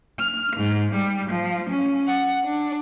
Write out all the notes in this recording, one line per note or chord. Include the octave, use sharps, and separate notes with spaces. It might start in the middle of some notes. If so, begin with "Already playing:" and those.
F6
G#2
G3
F3
C#4
F#5
D4